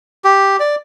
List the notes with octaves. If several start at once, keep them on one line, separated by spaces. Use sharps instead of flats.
G4
D5